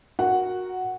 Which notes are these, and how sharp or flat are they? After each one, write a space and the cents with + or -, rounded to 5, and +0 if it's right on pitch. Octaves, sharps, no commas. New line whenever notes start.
F#4 -15 A#4 +0 F#5 +0